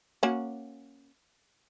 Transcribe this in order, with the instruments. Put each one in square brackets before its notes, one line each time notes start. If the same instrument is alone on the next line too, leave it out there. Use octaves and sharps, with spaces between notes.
[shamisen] A#3 C#4 F#4